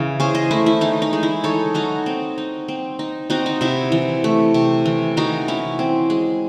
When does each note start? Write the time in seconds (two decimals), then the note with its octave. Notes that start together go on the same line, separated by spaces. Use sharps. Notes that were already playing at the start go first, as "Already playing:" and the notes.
Already playing: C#3 E3
0.20 C#4 G#4 C5
0.35 C5 D#5
0.51 A3 E4
0.66 E4
0.81 E3 D#4
1.02 D#4
1.13 G#3
1.23 E4
1.44 D#4 A4 C#5
1.74 F#3 D#4 F#4
2.06 C4
2.38 D#4
2.68 C4
2.99 D#4
3.30 C4 D#4 F#4
3.46 D#4
3.61 C3 E4
3.92 E3
4.24 A3
4.54 C3
4.86 E3
5.17 E3 D#4 F#4
5.48 C#4 E4
5.79 C4
6.10 G#3